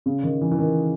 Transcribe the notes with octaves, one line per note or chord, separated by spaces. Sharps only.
C#3
D#3
E3
E3
D#3